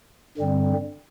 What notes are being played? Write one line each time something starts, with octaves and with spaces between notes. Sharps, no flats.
G2 D3 G3 C4